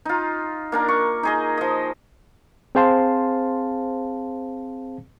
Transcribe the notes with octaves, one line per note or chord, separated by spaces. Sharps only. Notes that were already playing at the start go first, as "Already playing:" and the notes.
D#4 F4
A#3 D4 A#4
C#6
D#4 G#4 D#5
F3 D#5
C4 G#4 C5 F5 A5 C6